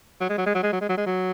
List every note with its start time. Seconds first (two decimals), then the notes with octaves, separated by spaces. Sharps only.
0.20 F#3
0.29 G#3
0.38 F#3
0.46 G#3
0.55 F#3
0.63 G#3
0.72 F#3
0.81 G#3
0.89 F#3
0.97 G#3
1.06 F#3